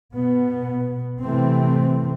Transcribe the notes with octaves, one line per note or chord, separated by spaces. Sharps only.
B2 B3
C3 E3 A3 C4